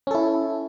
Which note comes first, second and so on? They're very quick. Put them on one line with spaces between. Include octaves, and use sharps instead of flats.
C#4 A4 E4